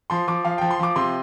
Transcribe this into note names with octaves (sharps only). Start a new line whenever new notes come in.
F3 C6
F3 D6
F3 F5
F3 G5
C6
F3 D6
C3 C6